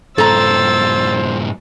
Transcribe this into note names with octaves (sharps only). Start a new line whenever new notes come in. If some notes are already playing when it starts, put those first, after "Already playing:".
G2 A#2 A4 C5 A#5 E6 A6